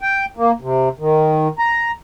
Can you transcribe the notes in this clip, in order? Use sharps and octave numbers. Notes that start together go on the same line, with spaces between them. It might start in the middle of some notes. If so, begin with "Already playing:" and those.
G5
A#3
C3
D#3
A#5